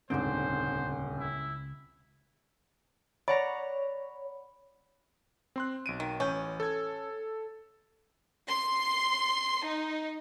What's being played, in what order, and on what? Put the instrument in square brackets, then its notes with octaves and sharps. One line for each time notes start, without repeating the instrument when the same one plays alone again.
[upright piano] D#1 G#2 D3 [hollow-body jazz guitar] C#2 C4 [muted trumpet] C5
[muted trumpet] E4
[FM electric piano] C#5 [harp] D5 F#5 A#5 [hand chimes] B5
[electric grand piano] C4 C6 F#6
B1 D7 D#7
[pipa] D#3
[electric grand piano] A1 G6 [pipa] C#4
[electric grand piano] A4 G#6
[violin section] C6
D#4